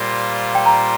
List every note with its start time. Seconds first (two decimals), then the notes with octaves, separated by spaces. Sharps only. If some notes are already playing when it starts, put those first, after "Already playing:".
Already playing: A#2 G3 A#3 F4 C5
0.55 G5
0.66 A#5